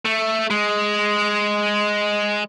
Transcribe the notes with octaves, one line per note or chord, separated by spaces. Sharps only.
A3
G#3